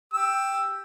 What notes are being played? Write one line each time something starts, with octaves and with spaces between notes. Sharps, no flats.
G4 E6